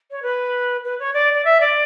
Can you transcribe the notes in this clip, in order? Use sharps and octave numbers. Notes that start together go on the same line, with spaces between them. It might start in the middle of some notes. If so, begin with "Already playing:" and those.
C#5
B4
B4
C#5
D5
D5
E5
D5